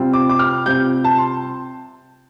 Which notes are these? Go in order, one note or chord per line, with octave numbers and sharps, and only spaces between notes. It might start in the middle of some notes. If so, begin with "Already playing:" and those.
Already playing: C3 G3 C4 F4
D6
D6
F6
C3 G3 C4 F4 G6
A5
C6